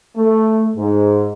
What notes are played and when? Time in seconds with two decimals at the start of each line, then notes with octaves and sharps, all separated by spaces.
0.16 A3
0.76 G#2